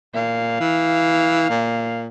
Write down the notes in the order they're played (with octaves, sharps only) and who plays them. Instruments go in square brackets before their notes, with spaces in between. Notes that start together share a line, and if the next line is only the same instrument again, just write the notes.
[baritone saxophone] A#2 [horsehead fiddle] F5
[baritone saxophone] E3
A#2